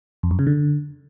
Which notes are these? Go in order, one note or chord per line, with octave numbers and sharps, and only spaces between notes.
F2
F#2
C#3
D3